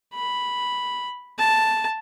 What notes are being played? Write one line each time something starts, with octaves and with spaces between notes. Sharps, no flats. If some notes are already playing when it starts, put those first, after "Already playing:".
B5
A5